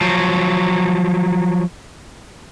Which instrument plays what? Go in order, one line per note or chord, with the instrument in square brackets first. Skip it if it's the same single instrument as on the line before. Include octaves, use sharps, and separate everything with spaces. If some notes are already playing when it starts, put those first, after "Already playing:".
[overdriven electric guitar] F3 F#3